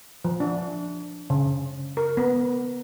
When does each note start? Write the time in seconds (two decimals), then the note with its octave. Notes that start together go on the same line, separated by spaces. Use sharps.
0.25 F3
0.40 D4
1.30 C#3
1.97 A#4
2.17 B3